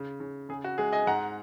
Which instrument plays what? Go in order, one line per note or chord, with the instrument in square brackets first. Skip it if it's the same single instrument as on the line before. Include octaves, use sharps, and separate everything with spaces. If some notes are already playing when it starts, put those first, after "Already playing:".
Already playing: [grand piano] C#3
C#3
C#3 G#4
F#4
G#3 G#4
D#5 G#5
G#2 F#5 A#5